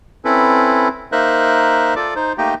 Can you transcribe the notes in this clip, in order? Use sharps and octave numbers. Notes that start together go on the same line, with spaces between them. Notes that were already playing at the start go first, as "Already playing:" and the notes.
C4 C#4 E4 A4 B4
A#3 D#4 A#4 C5 E5 F#6
F4 A4 D5 D6
D#4 C5
A3 A#3 D#4 G4 D#5 G5